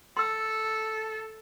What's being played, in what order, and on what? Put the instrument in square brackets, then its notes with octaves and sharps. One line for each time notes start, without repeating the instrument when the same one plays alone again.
[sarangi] A4 [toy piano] C6 E6